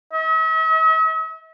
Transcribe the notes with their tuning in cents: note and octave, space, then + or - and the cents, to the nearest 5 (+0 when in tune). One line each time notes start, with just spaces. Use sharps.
E5 -45